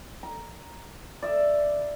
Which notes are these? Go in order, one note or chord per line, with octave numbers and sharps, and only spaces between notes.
A#5
D5 E5